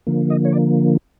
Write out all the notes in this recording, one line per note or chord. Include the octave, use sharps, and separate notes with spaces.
D3 F3 A#3
D#5
C#5
D5